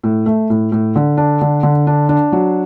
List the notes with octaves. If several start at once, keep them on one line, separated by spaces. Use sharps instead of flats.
A2
A3
A2
A2
D3
D4
D3
D3
D4
D4
F#3